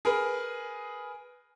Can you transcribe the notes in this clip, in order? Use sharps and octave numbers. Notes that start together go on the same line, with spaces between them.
G#4 A#4 B4